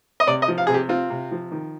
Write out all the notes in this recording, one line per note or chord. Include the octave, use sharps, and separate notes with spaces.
D#5
C3 D5
D#5
F3
F5
C3 G#4
G4
C4 F4
C3
F3
D#3